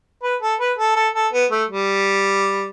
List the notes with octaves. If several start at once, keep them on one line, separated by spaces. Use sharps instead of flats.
B4
A4
B4
A4
A4
A4
B3
A3
G3